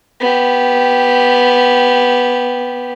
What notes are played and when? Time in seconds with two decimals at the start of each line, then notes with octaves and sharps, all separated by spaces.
0.20 B3 G4